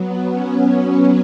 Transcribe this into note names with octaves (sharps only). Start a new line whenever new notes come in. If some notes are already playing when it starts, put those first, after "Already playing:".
Already playing: F#3 B3
C#4